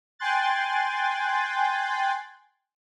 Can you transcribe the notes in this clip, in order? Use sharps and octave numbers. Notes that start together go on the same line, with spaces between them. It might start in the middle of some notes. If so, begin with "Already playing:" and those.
G5 G#5 C6 F#6 A6